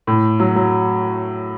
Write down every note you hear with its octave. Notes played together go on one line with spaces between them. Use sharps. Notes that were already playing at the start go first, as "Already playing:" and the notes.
A2
F#3
F#3